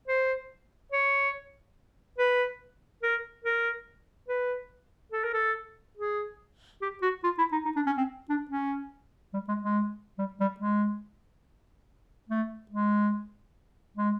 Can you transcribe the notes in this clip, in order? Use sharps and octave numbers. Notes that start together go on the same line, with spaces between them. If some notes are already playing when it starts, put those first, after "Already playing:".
C5
C#5
B4
A#4
A#4
B4
A4
A#4
A4
G#4
G4
F#4
F4
E4
D#4
D#4
D4
C#4
C4
D4
C#4
G3
G#3
G#3
G3
G3
G#3
A3
G#3
G#3